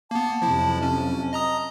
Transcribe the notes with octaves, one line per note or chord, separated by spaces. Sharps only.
A#3 B3 A5
F2 C3 F3 F#3 E4
C#4
D#5 A#5 D#6